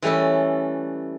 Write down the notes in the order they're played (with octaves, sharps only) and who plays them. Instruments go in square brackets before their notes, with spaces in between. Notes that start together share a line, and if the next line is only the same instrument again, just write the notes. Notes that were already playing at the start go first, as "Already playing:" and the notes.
[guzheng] E3 G3 A3 C#4 A4